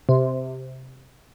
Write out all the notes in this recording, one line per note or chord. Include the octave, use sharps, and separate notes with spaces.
C3